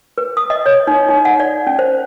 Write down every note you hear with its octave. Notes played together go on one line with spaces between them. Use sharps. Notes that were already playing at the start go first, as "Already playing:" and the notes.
B4
D#6
D#5
C#5
D#4
D#4
F#5
D5
C#4
C5